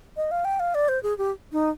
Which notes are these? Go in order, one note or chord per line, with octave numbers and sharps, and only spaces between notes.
D#5
F5
G5
F5
D5
C5
G#4
G4
D#4